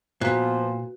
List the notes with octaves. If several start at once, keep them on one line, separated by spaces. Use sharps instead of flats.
A#2 F3 B3 F#4 B4